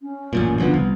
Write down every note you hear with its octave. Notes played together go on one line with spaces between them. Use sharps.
C#4
A1 F#2 A#2
F#1 D3 F3 B3
C2